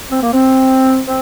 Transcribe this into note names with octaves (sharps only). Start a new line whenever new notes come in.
C4
A#3
C4
C4